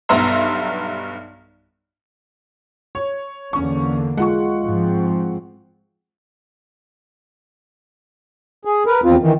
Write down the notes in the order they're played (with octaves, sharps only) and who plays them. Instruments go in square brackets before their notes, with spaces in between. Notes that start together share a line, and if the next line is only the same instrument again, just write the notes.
[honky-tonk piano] B1 G2 B3 E5 A#5 C6
C#5
[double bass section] E2 D3 A#3 [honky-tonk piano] C#4 C#6
[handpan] G#3 F4 [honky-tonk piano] F#5 C#6
[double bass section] G#2 F3 C4
[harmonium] G#4
A#4 B4
E2 C4 F4
D#3 E3